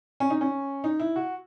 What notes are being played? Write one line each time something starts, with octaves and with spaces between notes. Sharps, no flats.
C#4
D#4
C#4
D#4
E4
F#4